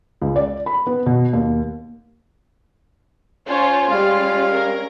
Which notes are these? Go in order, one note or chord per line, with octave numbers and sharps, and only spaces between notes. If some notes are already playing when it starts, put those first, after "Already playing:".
C#2
D5
B5
B3
B2
D#2
C#4 F4 C5 C#5
G3 G#3 C#4 F5
A#4